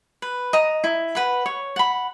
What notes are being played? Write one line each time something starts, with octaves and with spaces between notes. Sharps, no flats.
B4
D#5 A#5
E4
B4 F#5 B5
C#5
F#5 B5